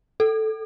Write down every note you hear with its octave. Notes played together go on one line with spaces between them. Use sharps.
A4